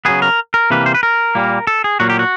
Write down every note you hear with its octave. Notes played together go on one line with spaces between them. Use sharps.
C#3 F#3 B3 G#4
A#4
A#4
C3 E3 G3 A#3 B4
C5
B4
A#4
A#2 G3 A#3
A4
G#4
A#2 F#3 A#3 F#4
G4
F#4